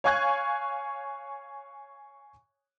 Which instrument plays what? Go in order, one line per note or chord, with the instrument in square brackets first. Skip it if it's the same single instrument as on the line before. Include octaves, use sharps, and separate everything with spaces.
[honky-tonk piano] C#5 F5 G#5 C#6 F#6 G#6